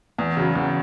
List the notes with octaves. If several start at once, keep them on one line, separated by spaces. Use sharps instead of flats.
E2
C#3 F#3
E2